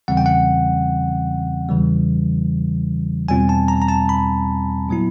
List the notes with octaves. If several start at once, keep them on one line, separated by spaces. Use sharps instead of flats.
E2 C#3 E3 G3 C4 F#5
G5
F#5
E2 C#3 E3 G3
E2 B2 G3 C4 F4 G#5
A5
A#5
A#5
A5
B5
A#2 F#3 B3 E4